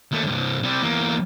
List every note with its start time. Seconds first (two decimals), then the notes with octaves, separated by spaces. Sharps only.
0.12 D#2 A3
0.27 C2 G2
0.63 C3 G3
0.82 E2 A#3